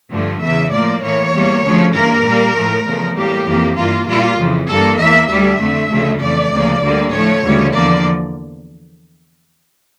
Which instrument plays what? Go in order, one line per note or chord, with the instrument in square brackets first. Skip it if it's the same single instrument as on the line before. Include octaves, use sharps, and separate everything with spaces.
[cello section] G2 D3 F3 A3
E2 C#3 E3 E5
A2 F3 A#3 D5
A2 E3 A#3 C#5
E2 E3 G3 A#3
D2 C#3 F3 A3
G2 E3 A#3 A#4
A#2 G3 A#3
A2 F3 A3
E2 C#3 F3 A3
A2 G3 A#3 G4
F2 E3 A#3
G2 E3 A#3 F4
A#2 G3 A#3 F4
F2 C#3 E3
G2 E3 A#3 A4
E2 E3 A#3 E5
D2 D3 G3 E5
F2 D3 A3
D2 C#3 F3 A3
F2 E3 A3 D5
D2 C#3 F3 A#3
D2 D3 G3 A#3
A2 F3 A3 C#5
D2 C#3 E3 G3
E2 D3 F3 A#3 D5